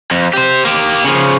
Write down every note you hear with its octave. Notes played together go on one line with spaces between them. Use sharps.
F2
G4 C5
A#3 G4
C#3 F3